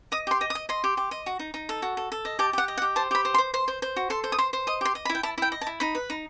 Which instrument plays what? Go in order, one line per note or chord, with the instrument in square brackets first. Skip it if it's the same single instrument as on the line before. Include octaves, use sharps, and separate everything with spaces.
[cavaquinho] D#5 D#6
G4 C6
D#5
D#6
D#5
D#5 C6
G4
G4
D#5
F#4
D#4
D#4
A4
F#4
A4
A4
D#5
G4 A5
G4 F#5
D#5
F#5
G4
C5 A5
G4 B5
C5
C6
C5
C5 C6
C5
C5
F#4
A4 C6
C5
D#6
C5 C6
C5
D#5 D#6
G4 C6
D#5
B5
E4
G5
E4 A5
E4 G5
D#5
A5
E4
D#4 B5
B4
D#4